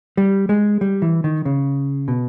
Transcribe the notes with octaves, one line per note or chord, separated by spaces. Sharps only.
G3
G#3
G3
E3
D#3
C#3
B2